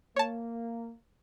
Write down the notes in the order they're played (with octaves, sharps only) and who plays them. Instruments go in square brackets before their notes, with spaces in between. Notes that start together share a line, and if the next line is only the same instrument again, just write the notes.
[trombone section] A#3 [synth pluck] C#5 A5